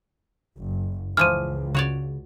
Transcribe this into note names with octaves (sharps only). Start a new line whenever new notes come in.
F#1
C#2 E3 F3 F6 D#7
C#3 F#4 C#5 D5